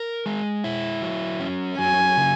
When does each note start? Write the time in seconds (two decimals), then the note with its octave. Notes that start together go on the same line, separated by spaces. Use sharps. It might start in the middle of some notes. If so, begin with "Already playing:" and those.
Already playing: A#4
0.26 G#3
0.64 E4
1.02 F#3
1.40 C#4
1.79 F#3 G#5
2.17 C#3